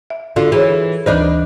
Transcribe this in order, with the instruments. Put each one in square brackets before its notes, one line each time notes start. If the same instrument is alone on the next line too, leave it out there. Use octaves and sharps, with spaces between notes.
[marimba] E5
[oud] D3 F4 [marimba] F#4
[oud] E3 [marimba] G#4 C5 C#5
[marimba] D2 E3 C5 [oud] D4 D#4 B4